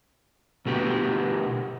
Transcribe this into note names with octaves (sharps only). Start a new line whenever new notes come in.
B2 A3 B3 G4